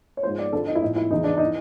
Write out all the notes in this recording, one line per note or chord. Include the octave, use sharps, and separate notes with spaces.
C#5
G#2 F3 C5
D5
F2 D3 F3 A4
D#4
E4
A2 F3 D#4
E4
E2 C#3 E3 D#4
D4
D#4
E3